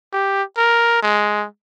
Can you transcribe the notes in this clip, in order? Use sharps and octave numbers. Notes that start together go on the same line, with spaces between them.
G4
A#4
G#3